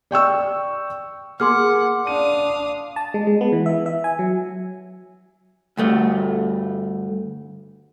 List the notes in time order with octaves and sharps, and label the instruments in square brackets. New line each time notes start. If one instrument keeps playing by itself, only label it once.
[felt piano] D5 G5 C#6 E6
[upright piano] A#3 G#4 [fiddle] F#5 [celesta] C6 D6 F6
[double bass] D4 [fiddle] F5 D#6 [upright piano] D#7
[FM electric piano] A5
G#3
G#3
B3
E3
E5
E5
G#5
F#3
[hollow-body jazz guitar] D2 G2 A3